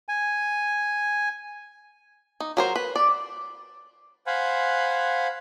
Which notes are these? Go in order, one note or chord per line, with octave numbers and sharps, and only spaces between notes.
G#5
D#4
F#3 A#4 C5
B4
D5
C5 F5 F#5 G#5 B5